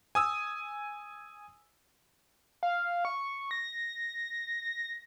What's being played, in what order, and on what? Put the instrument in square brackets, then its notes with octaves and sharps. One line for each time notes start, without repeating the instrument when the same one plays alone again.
[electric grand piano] G#5 D#6 E6
[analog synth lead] F5
C#6
A#6